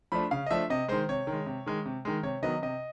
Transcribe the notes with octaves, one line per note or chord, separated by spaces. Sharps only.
F3 A3 D4 B5
C#3 F5
D#5
F3 A3 D4 E5
C3 D#5
D#3 G#3 C5
C3 C#5
D#3
G#3
C3
D#3 G#3
C3
D#3 G#3
C3 C#5
D#3 F#3 B3 D#5
C3 D#5